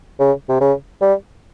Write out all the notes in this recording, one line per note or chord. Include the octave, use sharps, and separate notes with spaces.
C#3
C3
C#3
G3